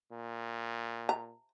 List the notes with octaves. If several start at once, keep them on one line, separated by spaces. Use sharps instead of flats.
A#2
A#5